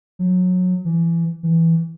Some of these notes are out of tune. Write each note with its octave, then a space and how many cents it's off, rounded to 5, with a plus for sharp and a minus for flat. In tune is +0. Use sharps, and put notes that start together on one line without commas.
F#3 -25
E3 +25
E3 +0